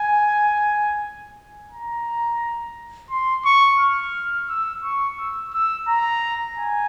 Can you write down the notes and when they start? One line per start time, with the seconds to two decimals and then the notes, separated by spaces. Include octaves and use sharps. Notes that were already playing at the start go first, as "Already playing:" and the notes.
Already playing: G#5
1.72 A#5
3.10 C6
3.45 C#6
3.79 F6
4.49 E6
4.85 C#6
5.19 E6
5.53 E6
5.89 A#5
6.57 G#5